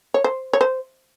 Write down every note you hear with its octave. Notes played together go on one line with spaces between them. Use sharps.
C#5
C5
C#5
C5